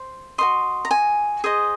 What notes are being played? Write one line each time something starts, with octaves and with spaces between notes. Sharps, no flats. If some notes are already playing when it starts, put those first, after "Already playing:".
Already playing: C5
F#4 C5 D#5 C6
A#5
G#5
G#4 C5 D#5